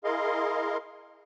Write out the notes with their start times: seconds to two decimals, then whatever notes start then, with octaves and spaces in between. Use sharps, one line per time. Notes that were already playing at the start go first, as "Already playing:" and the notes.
0.04 E4 G#4 A#4 D#5 F5 C6